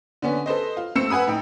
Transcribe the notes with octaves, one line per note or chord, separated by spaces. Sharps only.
D3 B3 C#4
A4 B4 C5 D#5
F4
A3 C4 E6 C#7 E7
B4 F#5 G#5 B5 D#6
A2 D#4 G5